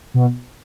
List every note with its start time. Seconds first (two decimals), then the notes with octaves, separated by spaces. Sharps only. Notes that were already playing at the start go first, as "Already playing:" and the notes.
0.14 B2